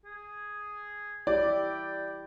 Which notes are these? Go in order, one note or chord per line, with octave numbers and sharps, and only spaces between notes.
G#4
E4 G4 D5 G5